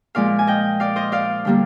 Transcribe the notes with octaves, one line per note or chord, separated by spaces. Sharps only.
A#2 F3 G#3 D5 F5
G#5
D#5 G5
D5 F5
C5 D#5
D5 F5
D3 G3 A#3